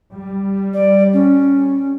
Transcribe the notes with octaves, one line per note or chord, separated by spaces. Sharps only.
G3
D5
C#4